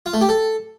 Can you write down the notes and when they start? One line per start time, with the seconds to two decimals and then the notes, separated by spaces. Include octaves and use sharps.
0.06 F4
0.14 A3
0.21 G4
0.29 A4